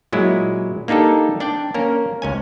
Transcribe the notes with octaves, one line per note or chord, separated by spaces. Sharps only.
A#2 F#3 G#3 E4
A#3 D4 D#4 G4 A4
D4 D5 G5
A#3 C#4 A#4
C#2 C#4 G#5